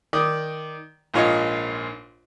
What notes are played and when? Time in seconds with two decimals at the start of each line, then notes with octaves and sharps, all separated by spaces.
0.13 D#3 D5 D#6
1.14 A#1 G#2 F4 C#5 D#5